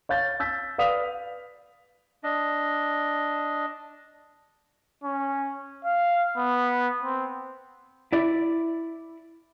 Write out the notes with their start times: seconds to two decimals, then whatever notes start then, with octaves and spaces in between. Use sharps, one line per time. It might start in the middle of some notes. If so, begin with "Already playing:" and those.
0.09 C#5 F5 G6 A6
0.40 E6 G6 A6 B6
0.78 B4 D5 F5 D#6 B6 F7
2.24 D4 D#5
5.04 C#4
5.85 F5
6.37 B3
7.03 C4
8.12 E4 D5